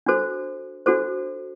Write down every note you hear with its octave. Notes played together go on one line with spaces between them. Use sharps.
D4 F#4 A4 C5
D4 F#4 A4 C5